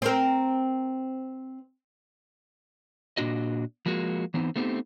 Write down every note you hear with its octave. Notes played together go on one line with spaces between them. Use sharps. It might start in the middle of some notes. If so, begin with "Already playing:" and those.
C4 A#4
A#2 C#3 D4 F#4 D#5
F3 G#3 A#3 F#4
E3 B3 C4 D#4
A3 B3 C4 D#4 G4